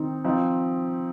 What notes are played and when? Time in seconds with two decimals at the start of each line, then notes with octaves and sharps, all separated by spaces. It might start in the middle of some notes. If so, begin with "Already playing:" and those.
Already playing: D#3 C4 D#4
0.24 F3 C4 D#4